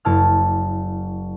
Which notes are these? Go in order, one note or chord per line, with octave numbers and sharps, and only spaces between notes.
F#1 E4 A5 F6